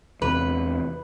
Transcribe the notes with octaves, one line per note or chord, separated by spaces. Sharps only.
E2 C3 B4